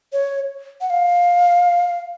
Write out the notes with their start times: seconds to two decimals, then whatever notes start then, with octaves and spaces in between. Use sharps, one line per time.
0.13 C#5
0.81 F#5
0.90 F5